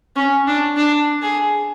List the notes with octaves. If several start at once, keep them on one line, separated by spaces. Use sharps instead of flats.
C#4
D4
D4
G#4